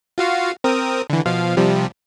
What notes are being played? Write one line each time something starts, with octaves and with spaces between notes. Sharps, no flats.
F4 F#4 F5
C4 A#4 D#6
D3 E3
B2 F3 F5
C3 F3 G3